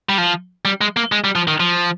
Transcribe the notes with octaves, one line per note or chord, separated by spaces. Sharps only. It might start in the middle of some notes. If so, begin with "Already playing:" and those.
G3
F3
G3
G#3
A#3
G#3
G3
F3
D#3
F3